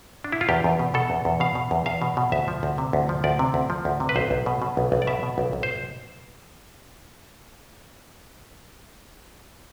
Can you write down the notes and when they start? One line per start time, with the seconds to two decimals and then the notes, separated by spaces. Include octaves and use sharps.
0.24 D4
0.32 E4
0.41 F4
0.49 E2 G4
0.64 E2
0.79 B2
0.94 B2 A4
1.10 E2
1.25 E2
1.40 B2 F5
1.55 B2
1.71 E2
1.86 E2 F5
2.02 B2
2.17 B2
2.32 D2 E5
2.48 F3
2.63 D2
2.78 C3
2.93 D2
3.09 F3
3.24 D2 D5
3.39 C3
3.54 D2
3.70 F3
3.85 D2
4.00 C3
4.09 B4
4.16 B1 C5
4.31 B1
4.46 B2
4.62 B2
4.77 B1
4.92 B1
5.02 D5
5.07 B2 E5
5.23 B2
5.38 B1
5.53 B1
5.63 C5